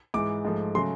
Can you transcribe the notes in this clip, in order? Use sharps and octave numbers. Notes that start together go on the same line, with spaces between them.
G#2 E3 G#3 D6
G#2 F3 A3
C#3 F#3 A3 C6